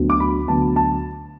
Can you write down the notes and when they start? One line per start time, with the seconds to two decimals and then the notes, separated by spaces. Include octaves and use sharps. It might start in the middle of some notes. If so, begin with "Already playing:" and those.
Already playing: D2 D3 F#3 B3
0.10 D6
0.20 B5
0.48 D2 D3 F#3 B3 A5
0.76 A5